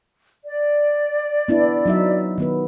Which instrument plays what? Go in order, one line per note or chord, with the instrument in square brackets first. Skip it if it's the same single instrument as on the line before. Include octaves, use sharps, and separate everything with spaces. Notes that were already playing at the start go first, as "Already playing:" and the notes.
[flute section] D5
[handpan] B3 D4 E4
F#3 D#4 E5
D#3 B3 B4